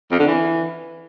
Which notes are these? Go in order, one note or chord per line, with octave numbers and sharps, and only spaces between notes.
F2
D3
E3